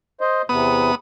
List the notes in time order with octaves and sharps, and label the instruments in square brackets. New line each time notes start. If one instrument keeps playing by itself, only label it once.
[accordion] C5 D#5
[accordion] E2 C3 [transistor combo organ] B3 D#6